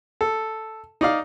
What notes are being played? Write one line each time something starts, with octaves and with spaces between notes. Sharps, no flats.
A4
D#4 D5 F5